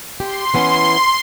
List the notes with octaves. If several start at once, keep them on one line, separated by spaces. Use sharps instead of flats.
G4 C6
E3 B3 C#4